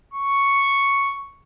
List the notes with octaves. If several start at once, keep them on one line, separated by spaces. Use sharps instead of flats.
C#6